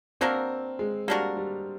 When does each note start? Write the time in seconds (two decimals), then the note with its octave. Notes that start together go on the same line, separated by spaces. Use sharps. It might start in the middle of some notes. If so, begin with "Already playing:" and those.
0.21 A#3 C4 D4 F#4 A#4
0.79 G#3
1.08 G3 A#3 D4 F#4 A#4
1.37 G3